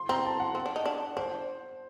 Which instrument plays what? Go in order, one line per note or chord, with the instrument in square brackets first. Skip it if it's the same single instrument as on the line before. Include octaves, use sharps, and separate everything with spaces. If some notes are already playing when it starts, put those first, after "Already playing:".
Already playing: [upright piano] C6
[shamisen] C4 [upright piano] A#5
[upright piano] A5
F#5
[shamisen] C4
D4
D#4
D4
[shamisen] D4 [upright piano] C5